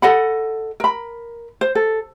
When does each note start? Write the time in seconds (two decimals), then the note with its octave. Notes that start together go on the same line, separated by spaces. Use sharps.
0.02 A4 D#5 F#5 B5
0.80 A#4 B5
1.61 C5
1.75 A4